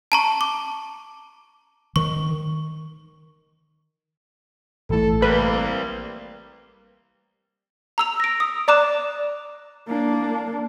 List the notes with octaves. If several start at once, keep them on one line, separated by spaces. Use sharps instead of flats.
A5 A#5 C#6
D6
D#3 C#6
A1 A2 A4
G3 A#3 C4 B4
A#5 E6 F7
A#6 D7
D#6
D5 A#5 D6 F#6 E7
A#3 D4